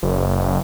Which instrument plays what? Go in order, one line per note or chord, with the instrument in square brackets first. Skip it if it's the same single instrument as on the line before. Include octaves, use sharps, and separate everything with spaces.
[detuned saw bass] F#1